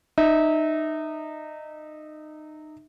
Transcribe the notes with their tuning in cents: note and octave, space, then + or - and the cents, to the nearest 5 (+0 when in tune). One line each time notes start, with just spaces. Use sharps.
D#4 -25 E5 -30